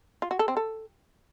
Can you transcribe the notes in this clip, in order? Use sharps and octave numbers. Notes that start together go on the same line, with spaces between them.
F4
F#4
A4
C4
A4